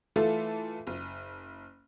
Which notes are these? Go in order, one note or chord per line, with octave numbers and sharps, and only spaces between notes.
E3 A3 F4 A4
F#1